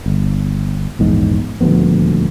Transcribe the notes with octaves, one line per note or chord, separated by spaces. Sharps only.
G1
A#1 E2 G#2
D#1 D2 F3 B3